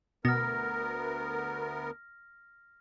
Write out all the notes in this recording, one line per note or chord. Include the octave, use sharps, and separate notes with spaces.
D2 B2 B3 A#4 F6 A#6